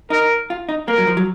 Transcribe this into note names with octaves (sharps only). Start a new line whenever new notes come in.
D#4 A#4
F4
D#4
A#3 A#4
F#3
F3
F#3